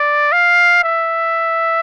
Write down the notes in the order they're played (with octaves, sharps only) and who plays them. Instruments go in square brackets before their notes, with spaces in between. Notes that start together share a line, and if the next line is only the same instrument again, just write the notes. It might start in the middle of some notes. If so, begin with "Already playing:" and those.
Already playing: [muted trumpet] D5
F5
E5